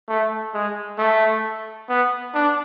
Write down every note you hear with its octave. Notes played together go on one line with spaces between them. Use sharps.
A3
G#3
A3
B3
D4